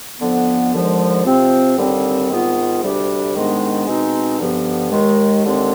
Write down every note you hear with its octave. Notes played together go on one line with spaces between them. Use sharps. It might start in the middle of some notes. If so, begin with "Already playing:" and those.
F2 D3 F3 B3
D#2 D3 F3 G#3
C3 F3 C4
D#2 D3 G3 C4
G#2 D#3 B3 F4
D2 C3 G3 D4 G4
G#2 D#3 G#3 B3 D4
B2 G#3 C4 D#4
G2 D3 F3 B3
D#2 D#3 G#3
D#2 D3 G#3 C4